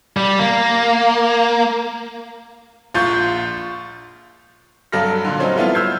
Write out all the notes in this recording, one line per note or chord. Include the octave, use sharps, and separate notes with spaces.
G3
A#3
A#1 F4 C#6 G6 A6
G2 F#3 A4 B5 F6 A#6
A#2 D3
F3 F#3 C4 C#4 D#4
G3 A3 B3 E4 F4
E6 F6 G6 G#6 C7